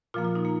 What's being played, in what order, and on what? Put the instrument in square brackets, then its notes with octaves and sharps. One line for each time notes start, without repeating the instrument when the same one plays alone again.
[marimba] A#2 F3 A#3 F4
F4
D#4
A#3